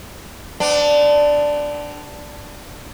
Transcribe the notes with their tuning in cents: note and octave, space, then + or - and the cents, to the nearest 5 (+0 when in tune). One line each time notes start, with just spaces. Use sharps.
B3 +45 D4 +0